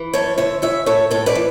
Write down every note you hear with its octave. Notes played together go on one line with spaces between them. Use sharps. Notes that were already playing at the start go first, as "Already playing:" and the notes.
Already playing: E3
F#2 A4 C#5
D3 C#5 E5
E3 C#5 E5
A2 A4 C#5
A2 A4 C#5
B4 D5
E3